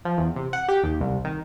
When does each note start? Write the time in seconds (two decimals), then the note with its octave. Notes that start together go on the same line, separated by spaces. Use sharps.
0.05 F3
0.18 E2
0.36 C3
0.53 F#5
0.68 G4
0.83 D#2
1.01 C2
1.25 D#3